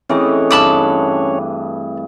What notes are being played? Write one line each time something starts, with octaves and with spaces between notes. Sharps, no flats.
E3 A3 C4 C#4 E4 G#4 C#5 D#5
G2 A5 B5 D6